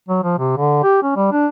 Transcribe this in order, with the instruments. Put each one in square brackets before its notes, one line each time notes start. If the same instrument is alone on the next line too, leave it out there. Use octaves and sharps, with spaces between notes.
[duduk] F#3
F3
C3
D3
G4
C#4
G3
D4